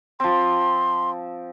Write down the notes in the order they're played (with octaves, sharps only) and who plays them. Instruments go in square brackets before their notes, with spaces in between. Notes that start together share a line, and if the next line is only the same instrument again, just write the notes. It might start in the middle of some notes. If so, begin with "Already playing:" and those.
[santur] F3 C4 [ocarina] C6